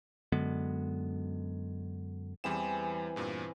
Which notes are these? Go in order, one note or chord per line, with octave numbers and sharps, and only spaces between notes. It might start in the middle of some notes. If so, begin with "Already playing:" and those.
F#2 D3 G#3 B3
E2 E3 G3 C4 G#4 E7
E2 G2 A#2